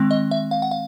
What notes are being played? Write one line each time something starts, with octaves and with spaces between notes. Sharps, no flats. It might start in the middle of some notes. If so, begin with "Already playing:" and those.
Already playing: D#3 G#3 C4
D#5
E5
F5
F#5
F5